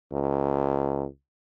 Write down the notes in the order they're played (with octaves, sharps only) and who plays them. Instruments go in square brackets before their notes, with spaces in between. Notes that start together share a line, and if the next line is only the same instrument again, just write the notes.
[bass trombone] C#2